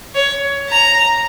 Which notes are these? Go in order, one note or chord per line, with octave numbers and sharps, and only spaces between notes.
C#5
A#5